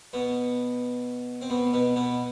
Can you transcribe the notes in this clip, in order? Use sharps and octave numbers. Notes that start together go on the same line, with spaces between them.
B2 B3
C4
B2 B3
B2 B3
B2 B3